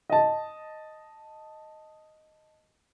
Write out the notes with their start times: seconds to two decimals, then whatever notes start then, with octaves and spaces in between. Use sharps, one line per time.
0.10 D#5 A5